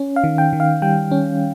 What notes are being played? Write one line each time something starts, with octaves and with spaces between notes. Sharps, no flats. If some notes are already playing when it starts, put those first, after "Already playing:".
Already playing: C#4
F5
D#3
G5
D#3
F5
G3 G5
C#4